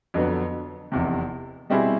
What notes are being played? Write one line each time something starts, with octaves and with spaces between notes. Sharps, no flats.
F2 D3 F#3 B3
F1 E2 C3
B2 G3 C4 E4 G#4